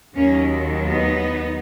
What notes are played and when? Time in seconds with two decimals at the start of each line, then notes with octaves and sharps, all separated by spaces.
0.16 D#2 D#3 F#3 A#3 C#4
0.83 B3 D#4